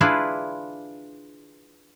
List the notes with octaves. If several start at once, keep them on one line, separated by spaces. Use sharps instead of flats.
D4 E4 F4 G#4 B4